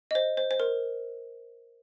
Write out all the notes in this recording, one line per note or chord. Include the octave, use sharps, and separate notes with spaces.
D#5
C5
C5
C5
A#4